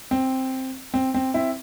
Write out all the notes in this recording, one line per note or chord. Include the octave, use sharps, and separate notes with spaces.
C4
C4
C4
C4 E4